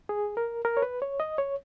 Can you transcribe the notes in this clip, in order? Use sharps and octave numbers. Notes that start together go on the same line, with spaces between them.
G#4
A#4
A#4
C#5
B4
C#5
D#5
C#5